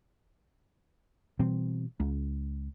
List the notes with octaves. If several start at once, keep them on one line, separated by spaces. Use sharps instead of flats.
B2 E3 G3 C4
C#2